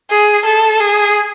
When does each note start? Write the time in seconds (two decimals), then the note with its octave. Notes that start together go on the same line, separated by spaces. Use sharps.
0.10 G#4
0.46 A4
0.80 G#4